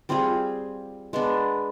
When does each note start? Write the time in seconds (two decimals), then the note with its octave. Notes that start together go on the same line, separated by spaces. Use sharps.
0.09 G3 C4 F4 G#4
1.13 G#3 B3 D4